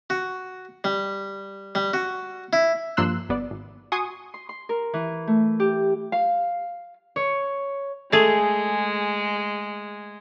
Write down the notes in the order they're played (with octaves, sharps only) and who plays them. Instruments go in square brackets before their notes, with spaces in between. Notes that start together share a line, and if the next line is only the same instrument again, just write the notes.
[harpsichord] F#4
G3
G3
F#4
E4
[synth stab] G2 F3 A#3 C6 E6 F#6
G1 B3 D5
G#1
F#4 G#5 C6 C#6 D#6
[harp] C6
C6
A#4
E3
A3
G4
[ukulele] F5
[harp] C#5
[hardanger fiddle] G#3 [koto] A3 G#4